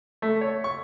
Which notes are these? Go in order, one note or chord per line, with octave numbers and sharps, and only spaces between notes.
A3
C#5
C#6